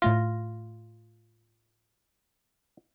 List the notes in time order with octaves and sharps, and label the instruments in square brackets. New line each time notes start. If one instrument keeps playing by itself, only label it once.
[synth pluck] A2 A3 A#6 [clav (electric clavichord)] F4